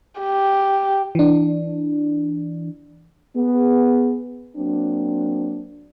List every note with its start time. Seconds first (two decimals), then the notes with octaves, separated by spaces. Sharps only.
0.21 G4
1.15 E3 D4
3.36 B3 G#4
4.57 F#3 A#3 C4 D4